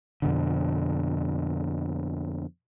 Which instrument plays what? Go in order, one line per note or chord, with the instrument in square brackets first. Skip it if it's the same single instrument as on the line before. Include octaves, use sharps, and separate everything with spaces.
[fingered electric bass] F2 B2 D3